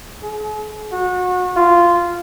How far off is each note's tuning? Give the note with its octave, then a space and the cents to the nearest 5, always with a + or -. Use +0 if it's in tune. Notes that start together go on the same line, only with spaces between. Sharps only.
G#4 +45
F#4 -30
F4 -10